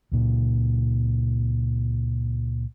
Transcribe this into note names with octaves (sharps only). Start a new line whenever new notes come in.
C#2 A#2